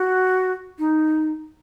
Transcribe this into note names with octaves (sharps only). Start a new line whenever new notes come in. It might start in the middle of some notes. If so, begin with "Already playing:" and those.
Already playing: F#4
D#4